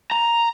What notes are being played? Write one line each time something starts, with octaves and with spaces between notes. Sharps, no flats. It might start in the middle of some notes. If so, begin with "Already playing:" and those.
A#5